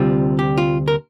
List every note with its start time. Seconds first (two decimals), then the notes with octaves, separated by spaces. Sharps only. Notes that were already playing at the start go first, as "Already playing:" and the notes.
Already playing: D2 C3 G3 C4 F4
0.39 G4
0.57 F4
0.88 A#4